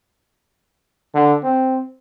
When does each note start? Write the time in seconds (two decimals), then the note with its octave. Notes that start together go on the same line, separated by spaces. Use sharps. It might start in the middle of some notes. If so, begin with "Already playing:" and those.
1.15 D3
1.44 C4